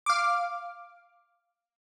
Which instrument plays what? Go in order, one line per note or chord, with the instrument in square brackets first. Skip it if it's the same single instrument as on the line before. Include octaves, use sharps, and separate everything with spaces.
[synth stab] F5 D6